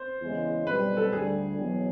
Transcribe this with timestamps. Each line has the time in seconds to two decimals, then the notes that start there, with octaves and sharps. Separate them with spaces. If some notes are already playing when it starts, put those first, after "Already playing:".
Already playing: C5
0.22 E2 C#3 E3 G#3
0.67 B1 B2 G3 B4
0.97 A4
1.12 D2 D3 G3 G#4
1.58 E2 B2 F#3